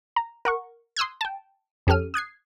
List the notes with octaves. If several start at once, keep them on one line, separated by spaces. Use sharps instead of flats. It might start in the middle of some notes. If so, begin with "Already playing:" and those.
A#5
A#4 F#5 C#6
C6 D#6 E6 F#6 G#6
G5 A5
F2 C#4 G4 A4 F6 D#7
D#6 F#6 G#6 C7